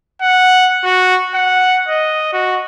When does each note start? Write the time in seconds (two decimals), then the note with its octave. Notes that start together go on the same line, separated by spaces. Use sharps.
0.22 F#5
0.84 F#4
1.34 F#5
1.89 D#5
2.33 F#4